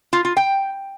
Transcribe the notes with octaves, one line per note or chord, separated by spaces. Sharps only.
F4
F4
G5